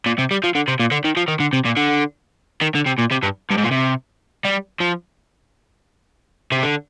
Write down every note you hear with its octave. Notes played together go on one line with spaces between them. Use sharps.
A#2
C3
G3
F3
D3
C3
A#2
D3
D#3
F3
D#3
D3
C3
A#2
D3
D#3
D3
C3
A#2
C3
G2
G2
G#2
A#2
C3
G3
F3
C3
D3